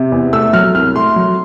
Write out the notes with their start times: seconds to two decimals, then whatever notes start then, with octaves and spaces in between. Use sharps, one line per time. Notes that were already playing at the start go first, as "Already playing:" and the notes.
Already playing: C3
0.12 E2
0.33 A3 E6
0.53 F#3 F6
0.75 C2 F6
0.95 A3 C6
1.16 F#3